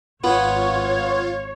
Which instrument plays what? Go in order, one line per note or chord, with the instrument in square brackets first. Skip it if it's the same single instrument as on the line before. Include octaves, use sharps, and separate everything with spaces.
[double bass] G#1 [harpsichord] B3 [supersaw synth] F4 [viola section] C#5